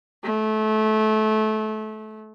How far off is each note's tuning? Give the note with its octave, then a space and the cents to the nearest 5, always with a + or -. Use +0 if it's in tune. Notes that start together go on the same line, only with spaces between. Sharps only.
A3 -25